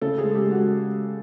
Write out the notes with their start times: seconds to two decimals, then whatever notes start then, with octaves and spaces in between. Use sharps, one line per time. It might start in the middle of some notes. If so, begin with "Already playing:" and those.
0.02 C#3 A4
0.18 G#4
0.23 G#3
0.35 G4
0.45 G#3
0.51 F#4